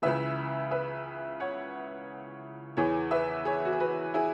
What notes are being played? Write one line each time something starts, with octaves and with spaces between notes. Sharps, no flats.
C#2 C#3 E3 B4 E5
B4 E5
C#5 F#5
E2 E3 G#4 C#5
B4 E5
G#4 C#5
F#4
G#4
F#4 B4
E4 G#4